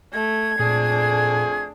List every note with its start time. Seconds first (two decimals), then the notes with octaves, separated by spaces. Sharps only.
0.13 A3 G#6
0.59 F2 A#2 A3 D4 G#4